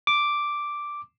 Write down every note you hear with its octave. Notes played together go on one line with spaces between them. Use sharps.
D6